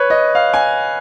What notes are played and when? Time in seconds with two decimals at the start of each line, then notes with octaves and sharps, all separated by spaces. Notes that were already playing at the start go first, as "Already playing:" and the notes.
Already playing: B4 C#5
0.10 D#5
0.35 F5
0.53 G#5